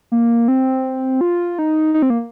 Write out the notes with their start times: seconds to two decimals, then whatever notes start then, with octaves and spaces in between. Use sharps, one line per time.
0.12 A#3
0.48 C4
1.21 F4
1.59 D#4
1.94 D#4
2.02 C4
2.10 A#3